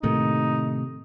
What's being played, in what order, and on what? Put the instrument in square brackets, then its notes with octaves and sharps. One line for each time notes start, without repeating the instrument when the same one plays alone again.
[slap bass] A2 D#3 A#3 [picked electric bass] C3 A3 [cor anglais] D#4